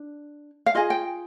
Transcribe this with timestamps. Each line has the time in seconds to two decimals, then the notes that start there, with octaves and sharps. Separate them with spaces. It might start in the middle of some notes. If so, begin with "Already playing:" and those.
Already playing: D4
0.66 F5
0.75 F4 G#4 D#5
0.90 G5